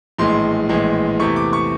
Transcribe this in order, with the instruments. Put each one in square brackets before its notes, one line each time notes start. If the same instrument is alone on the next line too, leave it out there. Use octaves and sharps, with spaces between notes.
[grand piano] A#1 A2 E3 G#3 C6
A#1 A2 E3 G#3
E2 C3 E3 A3 C#6
D6
C#6